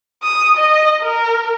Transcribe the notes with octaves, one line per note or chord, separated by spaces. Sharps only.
D#6
D#5
A#4